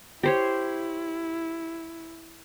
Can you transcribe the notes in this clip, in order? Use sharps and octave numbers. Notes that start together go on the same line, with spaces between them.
E4 G4 C5 C#5